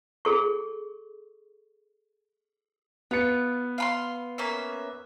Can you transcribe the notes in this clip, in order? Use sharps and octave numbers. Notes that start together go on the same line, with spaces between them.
G#4 A4 C#6
B3 F4 C#7
F5 B5 C6
A#3 C#4 E5